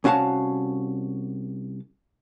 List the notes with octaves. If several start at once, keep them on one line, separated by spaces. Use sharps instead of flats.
C2 C#4 F#4 F5 A5